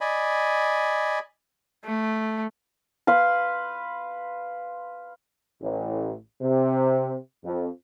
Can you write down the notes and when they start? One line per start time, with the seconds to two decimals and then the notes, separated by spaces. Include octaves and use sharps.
0.01 D5 D#5 G#5 B5
1.85 A3
3.07 B4 F5 C6
5.62 A1
6.41 C3
7.44 F2